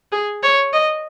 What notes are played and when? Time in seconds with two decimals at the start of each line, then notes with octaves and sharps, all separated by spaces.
0.12 G#4
0.43 C#5
0.72 D#5